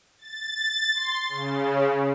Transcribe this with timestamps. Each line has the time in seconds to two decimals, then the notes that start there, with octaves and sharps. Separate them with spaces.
0.19 A6
0.94 C6
1.29 C#3